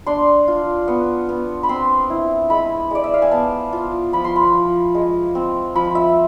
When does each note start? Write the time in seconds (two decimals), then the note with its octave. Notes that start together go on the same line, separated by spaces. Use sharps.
0.06 D4 C6
0.48 F4
0.88 B3
1.29 B3
1.63 B5
1.69 C4 C6
2.10 E4
2.50 G#3 B5
2.91 G#3 D5
3.04 E5
3.14 F5
3.22 G#5
3.31 B3 A5
3.73 F4
4.13 F3 B5
4.24 C6
4.36 B5
4.53 F3
4.95 G#3
5.35 C4
5.75 F3 B5
5.95 E5